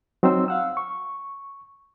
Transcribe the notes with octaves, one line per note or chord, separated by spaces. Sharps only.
F#3 C4 D#4 C5 E6
F5 F#5 E6
C#6